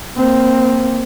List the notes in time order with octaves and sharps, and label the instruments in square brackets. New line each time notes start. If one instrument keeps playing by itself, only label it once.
[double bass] A#3 C4